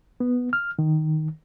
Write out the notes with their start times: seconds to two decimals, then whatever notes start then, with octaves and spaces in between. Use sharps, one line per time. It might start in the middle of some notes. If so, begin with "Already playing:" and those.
0.20 B3
0.53 F6
0.79 D#3